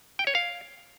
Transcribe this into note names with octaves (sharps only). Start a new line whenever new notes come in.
G5
C#5
F5